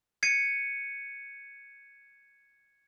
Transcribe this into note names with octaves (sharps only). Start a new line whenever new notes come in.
G#6 C7 C#7 D#7